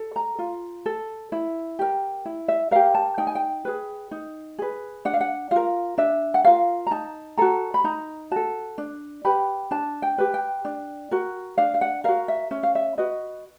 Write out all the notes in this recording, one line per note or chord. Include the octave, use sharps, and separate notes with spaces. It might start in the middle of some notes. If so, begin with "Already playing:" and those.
Already playing: A4
A#5
F4
A4
E4
G4 A#4
E4
E5
G4 A#4 F5
A5
D#4 G5
G#5
G5
G#4 B4
D#4
G#4 B4
D4 F#5
F5
F#5
F4 A#4 F5
D4 E5
F#5
F4 A#4 F5
A#5
D#4 A5
F#4 A4 A#5
B5
D#4 A#5
F#4 A4 A5
D4
G4 B4 B5
D4 A5
G5
G4 B4
G5
D4
F#4 A#4
D4 F5
F5
F#5
F#4 A#4 F5
E5
C#4 E5
F5
E5
F#4 B4 D#5